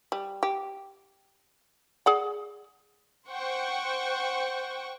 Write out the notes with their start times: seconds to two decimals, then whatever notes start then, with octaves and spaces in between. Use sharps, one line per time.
0.12 G3
0.43 G4
2.06 G#4 D5 F#5
3.29 C5 F#5 G5 C#6